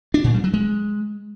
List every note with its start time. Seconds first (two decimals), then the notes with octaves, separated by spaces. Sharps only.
0.14 D4
0.24 A#2
0.34 G3
0.44 F#3
0.54 G#3